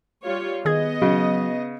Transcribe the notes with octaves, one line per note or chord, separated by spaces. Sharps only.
G3 F4 C#5
D#3 B3 G#4 D#5 G#6
C#3 F#3